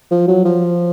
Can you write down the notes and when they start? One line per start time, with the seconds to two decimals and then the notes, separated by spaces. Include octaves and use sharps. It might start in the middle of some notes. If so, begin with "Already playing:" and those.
0.11 F3
0.28 F#3
0.45 F3